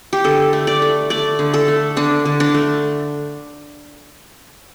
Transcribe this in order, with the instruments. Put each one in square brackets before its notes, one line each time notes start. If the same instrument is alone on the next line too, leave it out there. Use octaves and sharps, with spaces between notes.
[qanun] G4
D3 A4
A3
D5
A3
A3 D5
D3
A4
A3
D3 D4
D3
D4
A3